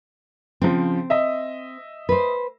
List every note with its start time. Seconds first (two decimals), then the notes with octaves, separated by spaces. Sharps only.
0.62 C#3 F3 C4
1.10 D#5 E5
2.09 B4 C5